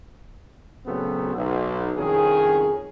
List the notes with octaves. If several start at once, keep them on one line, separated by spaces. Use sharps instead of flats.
A#2 C#3 F#3 A3 B3 C4
B1
C2 F2 D#3 C#4 G#4